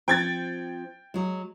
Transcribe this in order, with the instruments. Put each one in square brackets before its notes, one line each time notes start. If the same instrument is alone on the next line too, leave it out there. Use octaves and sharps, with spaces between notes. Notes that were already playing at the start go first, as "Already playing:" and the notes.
[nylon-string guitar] F3 C4 [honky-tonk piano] G5 G#6 A6
[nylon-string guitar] F#3 G#3